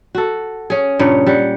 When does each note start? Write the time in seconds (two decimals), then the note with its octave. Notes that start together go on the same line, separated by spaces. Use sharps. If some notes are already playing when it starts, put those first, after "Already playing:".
0.15 F#4 A4
0.70 C#4 G#4
0.99 G2 A#2 C#3 C#5
1.27 G3 F#5